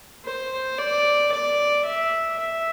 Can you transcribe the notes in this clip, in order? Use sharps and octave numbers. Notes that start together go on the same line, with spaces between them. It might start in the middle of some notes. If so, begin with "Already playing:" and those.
C5
D5
D5
E5
E5